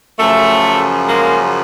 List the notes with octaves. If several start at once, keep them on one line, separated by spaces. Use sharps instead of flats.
F#2 C#3 F3 A3
G#3 A#3